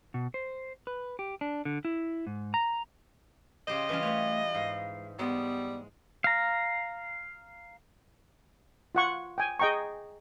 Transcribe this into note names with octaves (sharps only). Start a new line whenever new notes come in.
B2
C5
B4
G4
D4
D3
E4
G#2
A#5
C#3 G4 C5 D#5
E3 G3 C#4 F4
A3 B4 C#5
G#2 F5
G3 G#3 B3
F5 A#5
F4 F#5 C#6
G5 G#5
G#4 D#5 G5 A#5 C#6